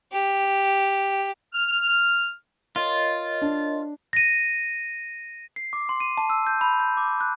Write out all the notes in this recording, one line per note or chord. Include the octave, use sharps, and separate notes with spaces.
G4
F6
F4 A#4 C#5 D#5
D4
A#6 D#7
C7
D6
C6
D#7
A5
E6
G6
B5
G6
D6
F#6